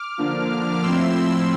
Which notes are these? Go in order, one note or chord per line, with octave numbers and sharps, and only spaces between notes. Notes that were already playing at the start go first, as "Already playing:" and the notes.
Already playing: D6 F6
D3 F3 A#3 D4
A2 F3 C4 E4 C6 E6